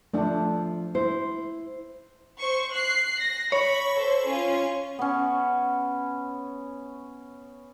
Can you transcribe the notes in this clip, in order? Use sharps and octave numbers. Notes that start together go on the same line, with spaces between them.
F3 A3 D4
E4 C5
C5 C#6
F#6 C7
A#6
C#5 B5
A4 C5
C#4 F4
B3 C#4